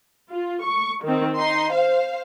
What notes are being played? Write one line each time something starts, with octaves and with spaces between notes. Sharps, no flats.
F4
C#6
D#3 C4
D#4 C6
C5 F5